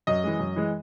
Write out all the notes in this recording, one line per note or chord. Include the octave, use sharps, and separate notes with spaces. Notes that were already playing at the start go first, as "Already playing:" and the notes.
F#2 D#5
E3 G#3
F#2
E3 G#3